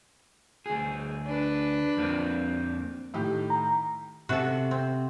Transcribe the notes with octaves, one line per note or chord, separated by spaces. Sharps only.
D2 G#4
D4 B4
F2 A#3 C4
A2 D#3 G4
A#5
C3 F#4 A4
C4